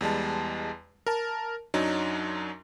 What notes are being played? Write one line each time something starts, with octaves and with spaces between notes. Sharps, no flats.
E2 G3 G#3 A5
A#4 A5
F#2 F#3 D4 D#4